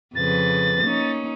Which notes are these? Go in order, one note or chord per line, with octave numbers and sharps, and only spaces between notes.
F2 C#3 B4 A6
A#3 C#4 D#4